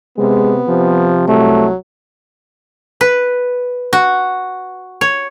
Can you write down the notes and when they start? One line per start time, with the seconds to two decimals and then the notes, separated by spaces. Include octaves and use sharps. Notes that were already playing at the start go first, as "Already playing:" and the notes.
0.18 C3 G#3 B3
0.67 C3 F3
1.28 C2 F#3 A3
3.01 B4
3.93 F#4
5.01 C#5